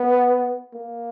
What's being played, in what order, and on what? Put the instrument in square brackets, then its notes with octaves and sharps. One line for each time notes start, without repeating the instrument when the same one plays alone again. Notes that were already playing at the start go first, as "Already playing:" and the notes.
Already playing: [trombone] B3
A#3